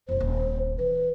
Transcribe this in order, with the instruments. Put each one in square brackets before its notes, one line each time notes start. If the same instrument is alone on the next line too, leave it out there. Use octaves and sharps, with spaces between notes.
[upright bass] D#1 F2 [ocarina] C5
[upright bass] D#1 C4
[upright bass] E3 [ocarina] B4